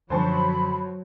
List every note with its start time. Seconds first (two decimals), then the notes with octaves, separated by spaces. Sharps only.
0.10 F#2 D3 F3 F#3 C5 A5 B5 C#6